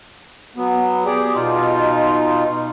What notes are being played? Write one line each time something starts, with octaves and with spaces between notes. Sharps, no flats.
F#3 B3
G4 G#4 D5
B2 D#4 F4